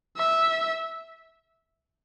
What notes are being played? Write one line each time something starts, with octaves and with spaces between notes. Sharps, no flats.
E5